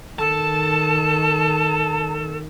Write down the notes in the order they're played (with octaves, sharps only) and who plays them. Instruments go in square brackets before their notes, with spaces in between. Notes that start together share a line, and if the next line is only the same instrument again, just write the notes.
[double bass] D#3 [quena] A4 [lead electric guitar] A5